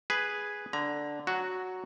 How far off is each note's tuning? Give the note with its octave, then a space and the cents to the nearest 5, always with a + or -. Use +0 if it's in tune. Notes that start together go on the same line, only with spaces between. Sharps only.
G#4 +0 B4 +0
D3 +0 A#5 +25
F#3 +0 F#4 +0